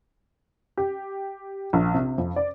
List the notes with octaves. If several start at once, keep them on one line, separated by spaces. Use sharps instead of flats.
G4
A#1
C3
F2
D5